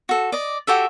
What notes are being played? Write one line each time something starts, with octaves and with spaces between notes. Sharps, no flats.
F#4 A4
D5 D#5
F#4 G4 A4 E5